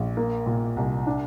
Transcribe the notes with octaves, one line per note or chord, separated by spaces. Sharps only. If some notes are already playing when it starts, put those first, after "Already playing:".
Already playing: A#1
A#3
A#2
C2
D4